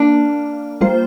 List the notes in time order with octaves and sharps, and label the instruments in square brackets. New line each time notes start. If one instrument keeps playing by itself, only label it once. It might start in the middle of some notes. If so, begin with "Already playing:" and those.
Already playing: [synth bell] A#3 [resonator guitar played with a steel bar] D4
[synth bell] G3 A#3 F4 C5